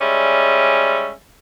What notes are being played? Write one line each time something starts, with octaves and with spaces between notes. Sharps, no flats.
G3 G#3 C#4 D5 E5